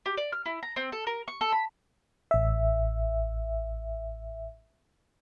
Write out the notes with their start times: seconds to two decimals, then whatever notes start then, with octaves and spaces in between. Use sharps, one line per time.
0.06 G4
0.18 D5
0.32 F6
0.46 E4
0.63 A#5
0.76 C4
0.92 A4
1.07 A#4
1.28 C#6
1.41 A4
1.52 B5
2.31 A1 E5